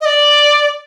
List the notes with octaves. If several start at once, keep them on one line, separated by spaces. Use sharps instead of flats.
D#5
D5